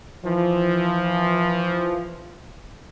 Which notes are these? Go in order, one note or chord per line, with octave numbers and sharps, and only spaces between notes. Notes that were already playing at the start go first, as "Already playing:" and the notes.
E3 F3